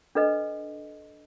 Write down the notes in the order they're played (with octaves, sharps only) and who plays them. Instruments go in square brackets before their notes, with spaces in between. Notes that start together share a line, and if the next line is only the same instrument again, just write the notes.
[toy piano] D4 A4 B4 D#5